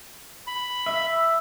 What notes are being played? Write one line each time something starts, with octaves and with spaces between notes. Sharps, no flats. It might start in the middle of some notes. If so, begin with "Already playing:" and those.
B5
E5